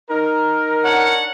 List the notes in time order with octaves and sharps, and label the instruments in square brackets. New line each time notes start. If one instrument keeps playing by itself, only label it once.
[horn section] D#4 A#4
[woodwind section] D4 C#5 F#5